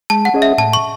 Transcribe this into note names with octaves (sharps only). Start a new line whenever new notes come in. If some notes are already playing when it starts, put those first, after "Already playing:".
G#3 A5
F#5
C#4 G#4 D#5
E5
A2 A5
C#6